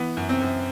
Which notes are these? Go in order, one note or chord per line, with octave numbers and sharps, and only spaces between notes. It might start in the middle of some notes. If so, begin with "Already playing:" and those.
Already playing: E3 B3
F#2
C4
F#2